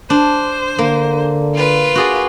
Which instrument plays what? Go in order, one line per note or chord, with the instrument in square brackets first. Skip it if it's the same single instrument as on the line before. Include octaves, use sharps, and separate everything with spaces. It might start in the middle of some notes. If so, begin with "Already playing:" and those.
[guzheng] D4 [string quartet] C5
[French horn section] D3 [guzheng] A#3
[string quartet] F4 B4
[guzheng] F#4 G#4 D5